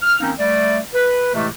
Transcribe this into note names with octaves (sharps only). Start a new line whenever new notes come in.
F6
D#3 A#3 C4 C#4 D#4
G3 A3 D5
B4
A2 C3 E3 G#3 A3